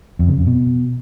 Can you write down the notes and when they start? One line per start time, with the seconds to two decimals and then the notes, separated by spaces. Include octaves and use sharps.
0.19 F2
0.29 C#3
0.38 F2
0.47 B2